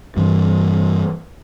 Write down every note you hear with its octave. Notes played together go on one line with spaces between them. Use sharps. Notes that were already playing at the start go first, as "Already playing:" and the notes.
G2 E3